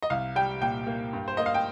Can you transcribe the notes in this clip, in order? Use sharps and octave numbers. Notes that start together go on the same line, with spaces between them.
D#5
C2 F5
G3 G5
A#2 G5
A#3
G2
C5
A#3 D#5
F5
G5